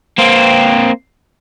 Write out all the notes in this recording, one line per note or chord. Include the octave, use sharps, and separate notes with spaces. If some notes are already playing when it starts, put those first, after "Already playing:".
A#3 C4